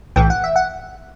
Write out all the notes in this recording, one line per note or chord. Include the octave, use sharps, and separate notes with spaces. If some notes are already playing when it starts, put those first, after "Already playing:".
B1 A2 E3 G5
F#5
E5
F#5